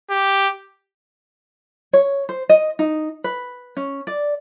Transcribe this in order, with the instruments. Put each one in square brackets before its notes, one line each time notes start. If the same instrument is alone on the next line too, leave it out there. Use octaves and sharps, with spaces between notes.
[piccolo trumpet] G4
[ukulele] C#5
C5
D#5
D#4
B4
C#4
D5